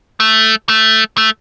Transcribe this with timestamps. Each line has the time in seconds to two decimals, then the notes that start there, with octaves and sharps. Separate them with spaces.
0.20 A3
0.69 A3
1.18 A3